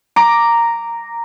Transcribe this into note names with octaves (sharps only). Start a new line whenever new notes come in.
A#5 D6